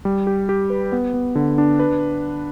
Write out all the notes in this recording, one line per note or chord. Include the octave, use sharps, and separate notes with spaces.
G3
G4
G4
B4
B3
B3
D3
D4
B4